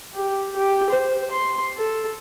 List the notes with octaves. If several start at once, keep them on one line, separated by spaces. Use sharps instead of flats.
G4
G4
C5
C6
A4